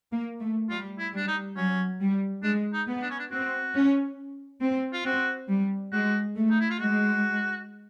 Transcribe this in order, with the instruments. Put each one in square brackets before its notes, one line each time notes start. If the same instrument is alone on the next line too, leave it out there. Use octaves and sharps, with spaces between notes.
[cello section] A#3
A3
[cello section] G3 [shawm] F4
[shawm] E4
[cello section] G3 [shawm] D4
[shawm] D#4
[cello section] F#3 [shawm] C#4
[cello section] G3
[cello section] G#3 [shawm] D4
[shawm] D#4
[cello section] B3
[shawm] D4
C#4
D4
[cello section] C4 [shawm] F#4
[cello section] C#4
C4
[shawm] F4
[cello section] C4 [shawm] F#4
[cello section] G3
[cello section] G#3 [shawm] F#4
[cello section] A3
[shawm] D#4
E4
F4
[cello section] G#3 [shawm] F#4